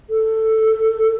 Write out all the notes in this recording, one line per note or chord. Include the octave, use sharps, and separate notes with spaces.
A4